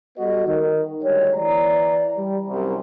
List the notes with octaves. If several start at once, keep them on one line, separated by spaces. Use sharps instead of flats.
G3 B3 F#4 A4 B4 D#5
D#3
D2 G3 G#3 C#5
E3 D5 A#5
G3
C2 F#2